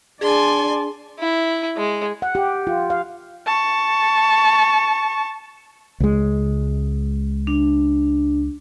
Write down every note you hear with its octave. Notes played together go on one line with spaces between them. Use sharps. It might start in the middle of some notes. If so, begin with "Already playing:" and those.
D4 G#4 D5 G#5 A5 C6
E4
G#3
F#5
G4
F4
F5
A5 C#6
C#2 G#3
D4